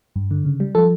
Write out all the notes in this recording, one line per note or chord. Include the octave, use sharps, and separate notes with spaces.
G2
D3
C#3
G3
F3 A4